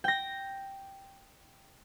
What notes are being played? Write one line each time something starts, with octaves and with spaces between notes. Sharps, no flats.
G5 A#6